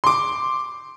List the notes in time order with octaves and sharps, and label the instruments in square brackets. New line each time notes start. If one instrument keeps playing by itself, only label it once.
[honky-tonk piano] C6 D6